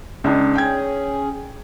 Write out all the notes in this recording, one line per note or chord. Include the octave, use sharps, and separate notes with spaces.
C#2 D4 D#4
C#4 G#4 G5 G#6